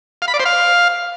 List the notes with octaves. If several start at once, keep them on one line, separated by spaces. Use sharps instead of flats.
F5
B5
D5
C5
F5